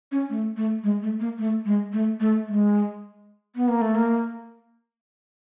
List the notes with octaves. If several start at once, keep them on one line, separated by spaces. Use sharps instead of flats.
C#4
A3
A3
G#3
A3
A#3
A3
G#3
A3
A3
G#3
B3
A#3
A3
A#3